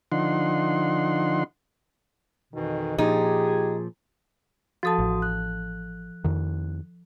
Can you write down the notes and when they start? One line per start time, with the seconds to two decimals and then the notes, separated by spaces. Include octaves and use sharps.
0.12 D3 F3 D#4 F#5 C6
2.53 F2 B2 D#3 E3
2.98 A#2 F3 D#4 G4 G#4
4.83 F3 F#4 A4 A5 D#6
4.99 A1
5.22 F#6
6.24 F2 D#3